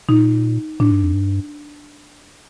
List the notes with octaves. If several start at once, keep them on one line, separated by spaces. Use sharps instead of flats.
A#2 D#4
A2 D4
G2
F2
G2